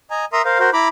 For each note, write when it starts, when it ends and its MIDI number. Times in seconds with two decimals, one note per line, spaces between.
0.11 0.25 75
0.11 0.25 80
0.11 0.25 82
0.33 0.42 70
0.33 0.42 76
0.33 0.42 82
0.33 0.42 84
0.33 0.42 87
0.45 0.59 70
0.45 0.59 72
0.45 0.59 77
0.59 0.70 66
0.59 0.70 70
0.59 0.70 72
0.73 0.88 64
0.73 0.88 82
0.73 0.88 83
0.73 0.88 86